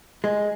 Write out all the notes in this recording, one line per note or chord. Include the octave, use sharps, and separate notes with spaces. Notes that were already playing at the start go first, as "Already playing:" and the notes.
G#3